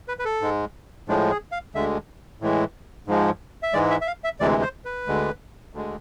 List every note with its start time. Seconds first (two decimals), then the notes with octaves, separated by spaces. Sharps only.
0.08 B4
0.19 B4
0.25 A4
0.41 G#2 G#3
1.08 A2 F3 G#3 D4
1.31 G#4
1.52 F5
1.75 D2 D3 G#3 E5
2.41 A2 E3 G#3
3.08 G#2 F3 G#3
3.63 E5
3.73 G#2 E3 G#3 D5
3.90 E5
4.01 E5
4.07 F5
4.24 E5
4.40 D2 C3 E3 G#3 D5
4.62 C5
4.85 B4
5.07 D2 D3 G#3
5.73 D2 D3 G#3